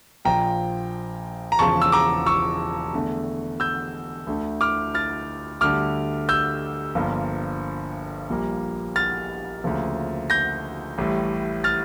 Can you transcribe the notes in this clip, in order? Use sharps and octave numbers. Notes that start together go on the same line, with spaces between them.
A#1 A#2 F3 G5 A#5
A#5
E1 E2 C#3 F3 A5 C#6
E6
A#5 D6
C#6 E6
E2 D3 A3
E6 G6
D2 D3 A3
D6 F6
F6 A6
D2 D3 G3 D6 F6
E6 G6
G1 G2 F3 A#3
A#1 A#2 G3 A#3
F6 A6
D2 C#3 F3 A#3
G6 A#6
A1 A2 G3
F6 A6